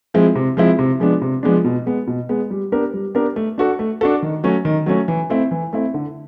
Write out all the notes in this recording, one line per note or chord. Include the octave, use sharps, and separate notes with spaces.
F3 G#3 C4 E4
C3
F3 G#3 C4 E4
C3
F3 G#3 B3 D4
C3
F3 G#3 B3 D4
B2
G#3 B3
B2
G#3 B3
G3
B3 D4 G4 A#4
G3
B3 D4 G4 A#4
A3
D4 F#4 A4
A3
D4 F#4 A4
D#3
F#3 A3 C#4
D#3
F#3 A3 C#4
E3
A3 C4 E4
E3
A3 C4 E4
D3